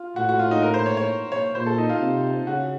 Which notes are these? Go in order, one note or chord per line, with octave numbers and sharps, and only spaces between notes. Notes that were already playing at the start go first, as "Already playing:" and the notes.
Already playing: F4
A2 F#4
F#4
F4
D#4
A#4
C5
C#5
C#5
C#5
A#2 C5
A4
D#4
F4
C3
C#3 F#4